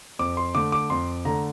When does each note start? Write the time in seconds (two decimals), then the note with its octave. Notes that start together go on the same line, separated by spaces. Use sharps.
0.19 F2 D6
0.37 C6
0.55 D3 A3 D6
0.72 D6
0.90 F2 C6
1.25 D3 A3 A#5